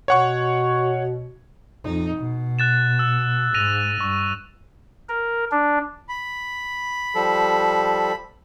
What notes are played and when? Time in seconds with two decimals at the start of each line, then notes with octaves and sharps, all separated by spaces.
0.08 B2 C#5 F#5 C#6
1.85 F2 D#4
2.16 B2
2.59 F#6 A6 E7
2.99 E6
3.54 G#2 A#6 D#7 F7
4.00 G2 C#6
5.09 A#4
5.51 D4
6.09 B5
7.15 F3 G3 A4